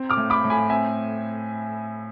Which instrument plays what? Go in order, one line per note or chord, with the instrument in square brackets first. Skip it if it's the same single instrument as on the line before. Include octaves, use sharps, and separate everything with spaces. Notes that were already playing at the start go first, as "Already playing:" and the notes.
Already playing: [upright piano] C4
D6 F6
A2
B5 D6
A2
G#5 B5
C4 E5 G#5